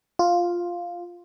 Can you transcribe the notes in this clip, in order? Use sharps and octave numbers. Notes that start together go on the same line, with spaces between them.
F4